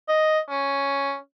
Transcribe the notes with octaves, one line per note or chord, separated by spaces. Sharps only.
D#5
C#4